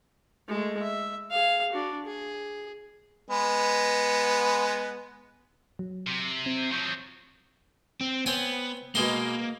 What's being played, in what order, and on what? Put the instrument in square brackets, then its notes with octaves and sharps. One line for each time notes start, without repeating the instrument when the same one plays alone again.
[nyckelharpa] G#3 A3
E5
G#4 F5
D4 F#4
G#4
[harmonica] G#3 B3
[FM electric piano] F#3
[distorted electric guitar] C3
[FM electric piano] C4 G#6
[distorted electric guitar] F3 F#3 [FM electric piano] C#6 G6
[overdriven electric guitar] C4
[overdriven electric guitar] B3 [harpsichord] C4 C#5 G#5
[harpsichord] B2 G#3 C6 [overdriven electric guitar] A#3